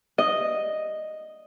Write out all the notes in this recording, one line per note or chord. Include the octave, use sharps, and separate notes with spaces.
D#5